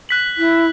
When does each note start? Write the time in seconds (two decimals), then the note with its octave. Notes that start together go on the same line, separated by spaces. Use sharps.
0.09 F#6 B6 F#7
0.37 E4